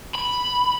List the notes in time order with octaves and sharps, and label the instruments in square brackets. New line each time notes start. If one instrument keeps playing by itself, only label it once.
[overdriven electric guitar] B5